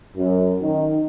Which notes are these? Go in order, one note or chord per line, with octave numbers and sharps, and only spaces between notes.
F#2
D#3